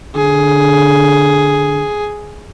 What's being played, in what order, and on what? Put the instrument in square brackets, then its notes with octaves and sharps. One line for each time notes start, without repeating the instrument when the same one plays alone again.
[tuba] D3 [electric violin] G#4